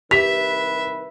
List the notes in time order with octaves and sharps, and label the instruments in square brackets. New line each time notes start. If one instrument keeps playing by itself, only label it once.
[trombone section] C2 D#3 B4 [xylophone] G4 F7 [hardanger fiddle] E5 [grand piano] B6